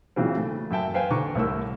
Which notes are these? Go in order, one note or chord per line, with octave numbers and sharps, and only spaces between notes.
A#2 C#3 E3 F#3 C4
A3
F#2 E5 G5 A5
B4 C5 F5 G5 G#5
D3 D4 A#5 C#6
C2 A2 A#4 E6